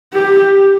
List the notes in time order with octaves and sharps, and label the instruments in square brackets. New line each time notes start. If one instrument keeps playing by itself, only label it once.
[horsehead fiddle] G4